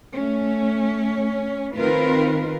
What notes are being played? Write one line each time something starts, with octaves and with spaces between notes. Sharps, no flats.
A3 C#4
D#3 C4 F4 A#4 B4